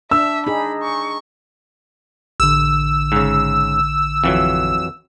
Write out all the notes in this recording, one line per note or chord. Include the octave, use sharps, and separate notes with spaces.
D4 E5 E6
D#4 G#4 B5
C#6
A1 D3 E6
G#2 C#3
F2 E3 F#3